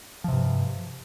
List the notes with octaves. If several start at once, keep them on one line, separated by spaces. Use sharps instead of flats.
G2 C3 F3